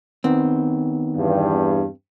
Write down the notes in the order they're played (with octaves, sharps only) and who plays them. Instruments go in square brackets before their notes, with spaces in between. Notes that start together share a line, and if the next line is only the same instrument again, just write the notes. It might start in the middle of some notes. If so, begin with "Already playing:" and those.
[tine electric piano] D#3 B3 D#4 [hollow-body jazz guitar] C4
[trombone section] E2 G2